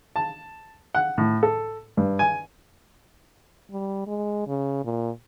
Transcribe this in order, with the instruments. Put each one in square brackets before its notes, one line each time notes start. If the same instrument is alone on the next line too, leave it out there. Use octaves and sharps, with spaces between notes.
[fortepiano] A5
F#5
A2
A4
G2
G#5
[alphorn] G3
G#3
C#3
A#2